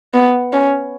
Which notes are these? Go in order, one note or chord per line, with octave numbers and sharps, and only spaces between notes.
B3
C#4